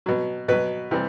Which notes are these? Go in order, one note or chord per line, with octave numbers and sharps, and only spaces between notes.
B2 F#3
B2 F#3 B4
C3 E3 G3